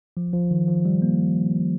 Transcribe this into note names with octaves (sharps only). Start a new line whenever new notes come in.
F3
F3
D#3
F3
G3
A#3